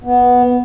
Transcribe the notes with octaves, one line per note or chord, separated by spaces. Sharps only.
B3